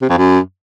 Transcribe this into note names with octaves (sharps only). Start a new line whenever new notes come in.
C3
F2
F#2